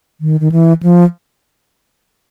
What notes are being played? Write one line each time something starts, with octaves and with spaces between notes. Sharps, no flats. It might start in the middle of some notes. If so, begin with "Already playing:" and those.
D#3
D#3
E3
F3